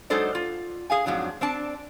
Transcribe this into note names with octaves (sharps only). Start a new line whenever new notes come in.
F#3 G#3 D#4 A4 C5 D5
F4
G#4 F5 G#5
F2 G#2 F#3 D4
C4 D4 D5 A5